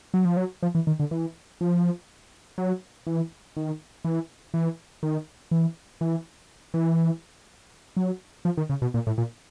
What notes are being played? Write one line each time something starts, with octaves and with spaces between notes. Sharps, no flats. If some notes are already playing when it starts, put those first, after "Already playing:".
F#3
F3
F#3
F3
E3
D#3
D3
E3
F3
F#3
E3
D#3
E3
E3
D#3
E3
E3
E3
F#3
F3
D#3
C#3
B2
A#2
A2
A#2